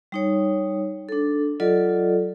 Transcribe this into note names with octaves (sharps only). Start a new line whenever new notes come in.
G3 D#4 C#5
D4 A4
F#3 F4 A4 D5 D#5